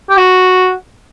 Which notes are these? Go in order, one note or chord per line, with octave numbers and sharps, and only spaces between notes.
G4
F#4